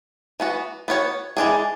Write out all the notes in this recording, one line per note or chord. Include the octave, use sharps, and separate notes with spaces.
E3 B3 F#4
B3 F#4 C#5
E3 G#3 D4 G#4